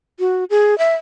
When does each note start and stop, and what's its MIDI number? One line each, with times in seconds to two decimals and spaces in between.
0.19 0.44 66
0.50 0.77 68
0.78 0.94 76